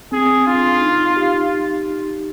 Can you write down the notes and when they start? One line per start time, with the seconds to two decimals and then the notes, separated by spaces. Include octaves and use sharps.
0.12 C4 G#4
0.47 D4 F4
0.82 D#4
1.17 G4